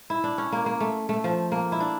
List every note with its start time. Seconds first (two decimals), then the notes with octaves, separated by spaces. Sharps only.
0.10 E4
0.24 D4
0.38 C#4
0.52 A#3
0.66 A#3
0.81 A3
1.09 A3
1.24 F3
1.52 A#3
1.72 E4
1.80 D4